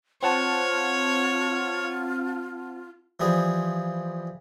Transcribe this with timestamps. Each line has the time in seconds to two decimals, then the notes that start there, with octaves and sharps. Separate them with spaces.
0.23 C4 F4 C#5 F#5 A5
3.20 E3 F3 G3 G#4